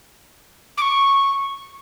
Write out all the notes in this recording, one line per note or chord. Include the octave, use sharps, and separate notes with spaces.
D6
C#6